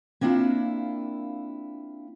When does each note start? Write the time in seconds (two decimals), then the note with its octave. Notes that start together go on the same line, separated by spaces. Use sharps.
0.21 A#3 C4 D4 E4 F4